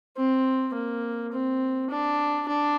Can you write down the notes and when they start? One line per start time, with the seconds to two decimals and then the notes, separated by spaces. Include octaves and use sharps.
0.17 C4
0.74 A#3
1.32 C4
1.90 D4
2.48 D4